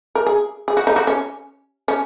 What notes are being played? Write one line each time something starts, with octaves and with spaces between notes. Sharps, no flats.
A#4
G#4
G#4
F#4
D#4
F#4
C#4
C#4